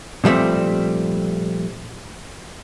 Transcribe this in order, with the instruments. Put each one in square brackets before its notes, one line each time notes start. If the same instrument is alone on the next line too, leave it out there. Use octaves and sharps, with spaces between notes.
[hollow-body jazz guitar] A#2 F3 G3 A3 C4